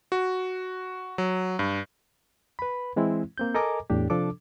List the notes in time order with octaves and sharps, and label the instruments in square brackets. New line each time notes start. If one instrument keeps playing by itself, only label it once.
[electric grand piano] F#4
F#3
G2
[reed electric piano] B4 B5
E3 G#3 C4 E4
A#3 C4 G6
A4 A#4 D#5 G#5 A#5 D6
E2 A2 D4 G4
C3 F3 D4 A4 D6